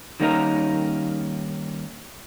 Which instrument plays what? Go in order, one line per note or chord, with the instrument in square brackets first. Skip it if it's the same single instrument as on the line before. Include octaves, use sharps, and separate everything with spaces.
[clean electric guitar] D#3 G3 A#3 C#4 D#4 A#4